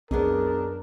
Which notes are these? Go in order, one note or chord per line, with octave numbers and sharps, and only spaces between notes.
C2 F#2 B3 D4 G#4 A#4 D#5